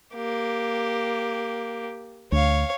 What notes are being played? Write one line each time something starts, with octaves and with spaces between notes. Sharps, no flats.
A#3 G4
D2 C#5 F5